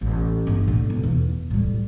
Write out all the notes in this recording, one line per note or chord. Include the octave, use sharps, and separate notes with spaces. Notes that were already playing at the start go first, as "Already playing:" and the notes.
A1
G1
A2 D3
B1
E2
A2 G3